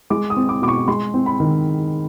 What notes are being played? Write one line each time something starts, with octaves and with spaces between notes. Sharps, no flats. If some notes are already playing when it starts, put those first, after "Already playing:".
G#3 D6
D#6
C4
D6
B2 D6
C#6
G#3 C6
C4
B5
D#3